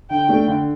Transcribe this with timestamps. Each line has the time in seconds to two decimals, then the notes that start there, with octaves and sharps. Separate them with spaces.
0.10 D3 G5
0.29 A3 D4
0.48 D3